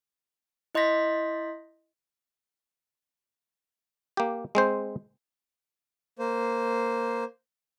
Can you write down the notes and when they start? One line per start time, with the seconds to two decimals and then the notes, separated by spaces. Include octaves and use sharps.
0.75 E4 D#5 C6 G6 A#6 B6
4.17 A#3 G4
4.55 G#3 C4 C5
6.19 A#3 C5